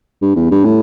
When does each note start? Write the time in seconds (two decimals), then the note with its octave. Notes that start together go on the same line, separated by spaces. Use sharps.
0.22 G2
0.36 E2
0.51 G2
0.65 A2